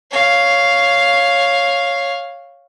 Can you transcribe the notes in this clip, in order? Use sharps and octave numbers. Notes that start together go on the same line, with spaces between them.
C#5 F5